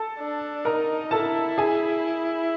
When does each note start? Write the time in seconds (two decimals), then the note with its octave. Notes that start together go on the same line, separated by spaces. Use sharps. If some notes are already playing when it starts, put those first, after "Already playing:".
Already playing: A4 A5
0.19 D4
0.65 D#4 A#4 A#5
1.11 E4 A4 A5
1.58 G#4 G#5